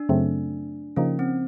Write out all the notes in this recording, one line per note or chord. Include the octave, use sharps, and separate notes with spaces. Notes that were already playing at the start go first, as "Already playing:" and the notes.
Already playing: D4
F#2 C#3 F#3 A3 C4
C#3 F3 A#3 C#4 D#4
C4